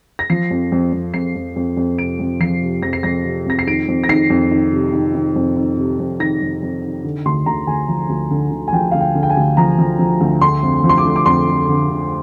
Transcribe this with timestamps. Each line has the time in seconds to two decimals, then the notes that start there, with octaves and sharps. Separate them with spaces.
0.19 A#6
0.30 F3 C7
0.51 F2
0.72 F2
0.93 F2
1.14 F2 C7
1.36 F2
1.56 F2
1.77 F2
1.99 C3 D7
2.20 F2
2.40 F3 C7
2.62 C3
2.82 F2 A#6
2.93 C7
3.03 F2 A#6
3.25 C3
3.46 F2 A#6
3.59 C7
3.67 D#3 D7
3.88 F2
4.04 A#6
4.09 D#3 C7
4.30 F2
4.51 D#3
4.73 C3
4.93 D#3
5.15 D#3
5.36 F2
5.56 D#3
5.77 C3
5.99 F2
6.20 D#3 A#6
6.42 F2
6.63 F2
6.84 D#3
7.04 D3
7.25 D2 C6
7.46 D2 A#5
7.67 D2 G#5
7.88 F3
8.09 D2
8.31 D3
8.52 D3
8.68 G#5
8.73 F3 G5
8.91 D2 F5
9.01 G5
9.15 D3
9.23 G5
9.30 G#5
9.37 D2
9.57 F3 A#5
9.78 F3
9.99 F3
10.20 D2
10.41 D3 C6
10.63 F2
10.84 F3
10.89 C6
10.98 D6
11.05 D3
11.16 D6
11.26 F2 C6
11.47 D3
11.69 D3
11.89 D3